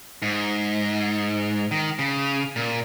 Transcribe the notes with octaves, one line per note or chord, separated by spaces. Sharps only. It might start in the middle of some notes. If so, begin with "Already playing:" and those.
G#2
D#3
C#3
A#2